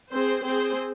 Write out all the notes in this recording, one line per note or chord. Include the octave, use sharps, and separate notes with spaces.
C4 G#4 C5
C4 G#4 C5